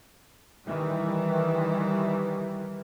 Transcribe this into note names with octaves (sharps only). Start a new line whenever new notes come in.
D#3 E3 G3